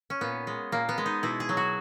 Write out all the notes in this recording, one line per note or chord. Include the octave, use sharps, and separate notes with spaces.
C#4
A#2 B3
G#3
A#2 A#3
B3
G#3
D#4
B2 E4
G#4
F#3
F#4